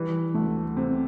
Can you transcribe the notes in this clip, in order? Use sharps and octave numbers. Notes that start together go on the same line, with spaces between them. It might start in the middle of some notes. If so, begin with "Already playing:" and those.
Already playing: E3 G3
D2 A3
C3 C4